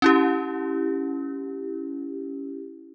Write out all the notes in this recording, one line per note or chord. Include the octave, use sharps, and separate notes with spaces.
C#4 E4 G4